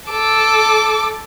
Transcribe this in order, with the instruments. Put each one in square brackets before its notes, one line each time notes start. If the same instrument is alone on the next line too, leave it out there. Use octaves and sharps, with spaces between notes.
[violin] A4 D6